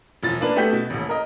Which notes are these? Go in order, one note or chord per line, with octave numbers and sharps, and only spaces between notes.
E1 F3 A6
A#3 D4 B4
A3 B3 F#4 G4 G6 B6
B2
D#1 A1
A#4 D#5